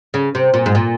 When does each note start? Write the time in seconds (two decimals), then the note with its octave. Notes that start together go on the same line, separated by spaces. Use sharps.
0.14 C#3
0.35 C3
0.54 A#2
0.66 G#2
0.75 A#2